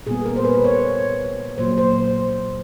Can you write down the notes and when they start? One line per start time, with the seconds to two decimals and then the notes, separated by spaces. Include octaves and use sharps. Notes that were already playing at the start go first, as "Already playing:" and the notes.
0.07 A#2 G3 B3 G#4
0.26 A#4
0.36 C5
0.45 B4
0.64 C#5
1.58 A#2 F#3 A#3 C5
1.78 C5